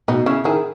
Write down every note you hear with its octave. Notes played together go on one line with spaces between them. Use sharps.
B2 B3 D#4
C#3 C#4 E4
D#3 E4 G#4